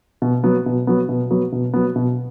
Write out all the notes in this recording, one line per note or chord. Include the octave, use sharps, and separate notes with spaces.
B2
F#3 B3
B2
F#3 B3
B2
F#3 B3
B2
F#3 B3
B2